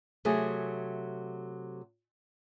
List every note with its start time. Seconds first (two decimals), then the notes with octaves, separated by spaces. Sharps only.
0.25 C3 F#3 A3 G#4